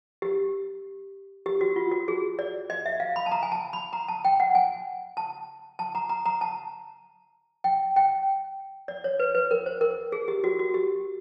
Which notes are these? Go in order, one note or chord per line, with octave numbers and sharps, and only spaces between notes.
G4
G4
F#4
F4
F#4
G#4
D5
D#5
E5
F5
B5
A5
A#5
G#5
A5
B5
A#5
A5
G5
F#5
G#5
A5
A5
A#5
A#5
A#5
A5
G5
G5
D5
C#5
B4
B4
A#4
C5
A#4
G#4
G4
F#4
F#4
G4